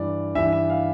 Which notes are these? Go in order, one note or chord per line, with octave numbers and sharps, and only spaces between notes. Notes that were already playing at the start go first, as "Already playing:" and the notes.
Already playing: G2 E3 D5
G2 E3 E5
E5
F5